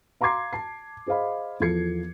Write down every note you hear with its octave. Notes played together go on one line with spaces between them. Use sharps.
F5 A#5 C6 D6 G#6 C7
A5 C7
G#4 C5 D#5 F5 B5
E2 F3 A4 G#6 C7 C#7